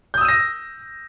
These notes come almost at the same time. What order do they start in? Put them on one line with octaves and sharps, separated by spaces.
G6 D#6 E6 D#7 A#6